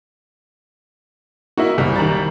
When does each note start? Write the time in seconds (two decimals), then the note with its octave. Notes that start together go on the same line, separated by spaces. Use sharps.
1.57 A#3 D#4 E4 F#4
1.78 F#1 B1 G3
1.96 D#3 A#5 A6